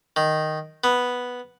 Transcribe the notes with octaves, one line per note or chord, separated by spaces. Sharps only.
D#3
B3